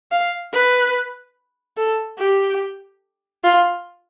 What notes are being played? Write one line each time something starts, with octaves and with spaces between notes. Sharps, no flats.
F5
B4
A4
G4
F4